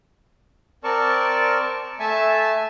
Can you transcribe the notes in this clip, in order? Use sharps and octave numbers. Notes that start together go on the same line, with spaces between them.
C4 A#4 D5 A5 C#6
A3 E5 G#5 A5 E6